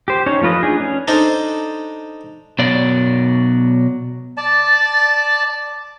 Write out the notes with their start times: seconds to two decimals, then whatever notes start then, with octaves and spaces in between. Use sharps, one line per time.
0.08 G4 C5
0.26 C#4 D#4 C#5
0.41 F3 A3 F4 B4 D#5
0.63 D4 D#4 G#4
0.80 C#4
1.08 D4 D#4 A4 C5
2.59 B2 F#3 D5
4.37 D5 A5